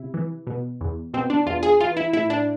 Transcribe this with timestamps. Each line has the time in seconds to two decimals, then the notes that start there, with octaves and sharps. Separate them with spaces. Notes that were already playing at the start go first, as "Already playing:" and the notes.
Already playing: C3 E4
0.14 E3
0.47 B2
0.81 E2
1.14 B2 C4
1.30 D4
1.46 E2 F4
1.63 G#4
1.80 E3 F4
1.97 E4
2.13 A2 E4
2.30 D4